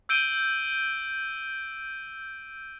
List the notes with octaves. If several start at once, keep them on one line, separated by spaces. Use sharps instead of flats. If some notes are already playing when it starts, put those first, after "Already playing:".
E6 G6 D7 D#7 G7